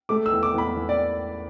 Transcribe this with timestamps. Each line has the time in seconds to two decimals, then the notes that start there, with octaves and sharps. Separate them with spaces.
0.09 A3 D6
0.26 E6
0.32 E2
0.43 D6
0.54 E2 B5
0.76 E2
0.89 D5